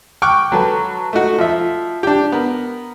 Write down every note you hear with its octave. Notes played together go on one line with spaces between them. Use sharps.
G5 C#6 D6 F6 F#6
F#3 A4 B4
A3 D#4 F#4
F3 E5
D4 G4
B3 A#4